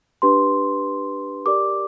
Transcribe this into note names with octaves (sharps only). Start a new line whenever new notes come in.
D4 G4 B4 C6
G4 A#4 D5 D6